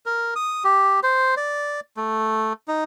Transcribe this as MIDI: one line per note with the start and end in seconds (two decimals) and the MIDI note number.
0.06 0.34 70
0.36 0.64 87
0.64 1.00 67
1.03 1.35 72
1.37 1.80 74
1.97 2.53 57
2.68 2.84 63